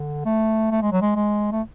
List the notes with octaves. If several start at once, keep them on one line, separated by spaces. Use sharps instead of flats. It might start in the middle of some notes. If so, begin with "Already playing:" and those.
Already playing: D3
A3
A3
G#3
F#3
G#3
G#3
A3